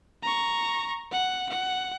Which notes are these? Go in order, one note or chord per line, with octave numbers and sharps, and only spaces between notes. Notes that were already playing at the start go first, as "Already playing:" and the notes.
A#5 C#6
F#5
F#5